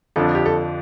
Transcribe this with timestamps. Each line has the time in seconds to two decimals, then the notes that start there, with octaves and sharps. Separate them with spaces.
0.16 F2 D3 F3 D4 A4
0.35 G4
0.46 A4